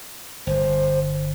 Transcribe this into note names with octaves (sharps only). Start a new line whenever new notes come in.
G1 C5